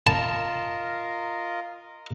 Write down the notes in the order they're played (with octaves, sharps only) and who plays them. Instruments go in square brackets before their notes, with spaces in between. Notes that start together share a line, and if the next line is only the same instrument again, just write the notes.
[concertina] F4 A#4 D#5 [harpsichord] A5